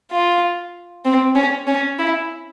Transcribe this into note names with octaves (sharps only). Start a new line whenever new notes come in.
F4
C4
C#4
C#4
E4